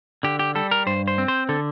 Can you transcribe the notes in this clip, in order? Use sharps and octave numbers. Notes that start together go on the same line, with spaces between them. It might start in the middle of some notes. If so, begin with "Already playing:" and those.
D3 G4
G4
G3 A4
A#4
G2 C5
C5
C4
C5
D3 A4